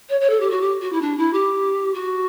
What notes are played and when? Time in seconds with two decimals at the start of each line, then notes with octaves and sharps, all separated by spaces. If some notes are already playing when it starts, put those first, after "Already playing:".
0.09 C#5
0.21 C#5
0.30 A4
0.40 G4
0.50 F#4
0.61 G4
0.82 F#4
0.92 E4
1.01 D4
1.18 E4
1.33 G4
1.94 F#4